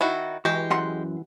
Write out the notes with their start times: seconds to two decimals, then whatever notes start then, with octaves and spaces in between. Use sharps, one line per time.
0.01 D#3 E4 F#4
0.45 E3 G#3 F#4 G4
0.70 F#2 F#5 C6